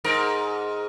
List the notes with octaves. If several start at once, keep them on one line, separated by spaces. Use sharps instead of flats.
G#2 A#4